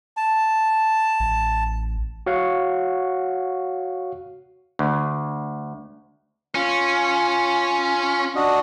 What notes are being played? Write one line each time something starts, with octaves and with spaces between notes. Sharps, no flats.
A5
A1
F#4 C#5 F5 F#5
D2
C#4 F4
D4 F#4 D#5